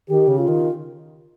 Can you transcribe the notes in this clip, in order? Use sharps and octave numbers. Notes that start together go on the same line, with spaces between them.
D#3 G4
C#3
F4
D#3